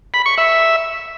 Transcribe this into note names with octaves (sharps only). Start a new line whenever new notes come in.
B5
C#6
E5